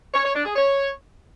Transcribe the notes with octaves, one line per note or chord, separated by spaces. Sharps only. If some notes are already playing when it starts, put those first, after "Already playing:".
C#5
C#5
D4
G#4
C#5